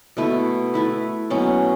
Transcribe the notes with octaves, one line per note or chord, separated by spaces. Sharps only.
B2 A3 E4 B4
A3 E4 B4
B2 F#3 C#4 F#4